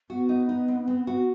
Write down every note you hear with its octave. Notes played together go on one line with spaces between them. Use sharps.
B3 F#4
D#4
D#4
C4
C4
F#4